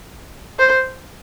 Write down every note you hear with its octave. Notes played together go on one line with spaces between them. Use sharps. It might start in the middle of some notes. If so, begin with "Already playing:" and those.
C5